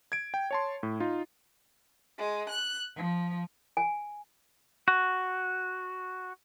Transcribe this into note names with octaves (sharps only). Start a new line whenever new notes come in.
G#6 D7
G5
C#5 A5 C6
A2
D#4 F4
G#3
F#6
F3
G#5
F#4